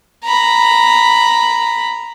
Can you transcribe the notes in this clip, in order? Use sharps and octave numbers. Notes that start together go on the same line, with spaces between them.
A#5 B5